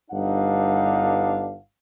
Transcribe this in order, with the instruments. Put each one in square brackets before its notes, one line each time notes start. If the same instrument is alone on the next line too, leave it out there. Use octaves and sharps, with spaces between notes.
[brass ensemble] G1 G2 D4 D#4 F5 F#5